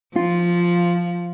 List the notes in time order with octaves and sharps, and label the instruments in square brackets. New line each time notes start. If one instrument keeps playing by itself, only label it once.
[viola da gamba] F3 [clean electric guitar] F4